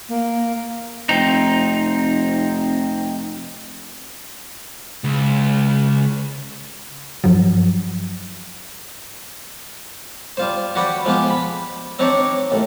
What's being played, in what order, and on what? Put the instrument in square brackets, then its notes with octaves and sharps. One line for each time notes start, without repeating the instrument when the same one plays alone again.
[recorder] A#3
[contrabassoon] F1 [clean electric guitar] C4 D#4
[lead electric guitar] C#2
[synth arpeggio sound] G2 F3 F#3
[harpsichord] G3 F4 C5
F#4 G4 B4 D5 F#5 G5
F3 G#3 B3 F4 G4
B5
C4 D4 D#4 G4 C#5 D5
D#2 A2